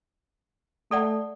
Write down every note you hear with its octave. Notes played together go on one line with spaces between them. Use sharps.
A3 A4 D5 F#5